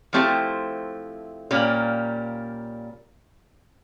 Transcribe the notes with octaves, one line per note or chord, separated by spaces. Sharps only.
F3 A3 C4 E4 G4
A#2 G3 A#3 C#4